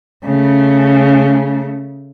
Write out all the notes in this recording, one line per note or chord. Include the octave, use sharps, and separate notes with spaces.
C#3 A3